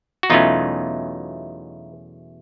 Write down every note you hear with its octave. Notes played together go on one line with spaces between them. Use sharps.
F#4
E2 B2 F#3 A3 C#4 D#4 F4